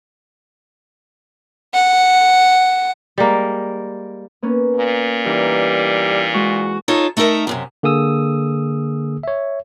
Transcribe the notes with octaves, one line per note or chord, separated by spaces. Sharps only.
F#5
G3 G#3 A#3
A#3 B3 C#4
A#2
E3 G3 D#4 A#4
G#3 F#4
D#4 F4 A4 C#5
A3 D#4 A4 A#4 E5
F#2 A2 C3
D3 A#3 G#4 D#6 E6
C#5 E5